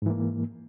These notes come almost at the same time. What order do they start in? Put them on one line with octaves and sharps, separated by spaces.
G#2 E3 A#3